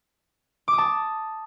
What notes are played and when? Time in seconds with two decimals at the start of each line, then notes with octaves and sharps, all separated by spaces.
0.68 D6
0.73 D#6
0.78 A5